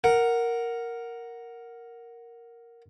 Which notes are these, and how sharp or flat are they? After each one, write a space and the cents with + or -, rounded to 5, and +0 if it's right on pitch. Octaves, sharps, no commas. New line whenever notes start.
A#4 +0 F#5 +0